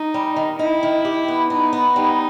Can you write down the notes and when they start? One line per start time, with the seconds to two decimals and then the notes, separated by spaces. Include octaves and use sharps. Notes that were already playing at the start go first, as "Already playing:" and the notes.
Already playing: D#4
0.14 G3
0.36 D#3
0.59 D#4 E4
0.83 D#3
1.05 G4
1.28 B3
1.50 B3 D#4
1.73 B3
1.96 G3 D#4